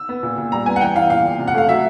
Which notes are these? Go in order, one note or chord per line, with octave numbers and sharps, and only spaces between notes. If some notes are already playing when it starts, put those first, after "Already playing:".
Already playing: E6
B3
A#2
A#2
G3 A#5
B3 G#5
F#5
E3 G5
E3 F5
A#2 F5
A#2
C3
F#5
A3 F5
F#3 E5